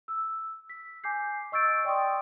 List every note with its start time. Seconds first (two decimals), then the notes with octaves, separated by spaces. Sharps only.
0.08 E6
0.70 B6
1.04 G#5 D6 G6 C7
1.52 D#5 C#6 E6 G6 A6 D7
1.85 D5 G5 C6 C#6 D#6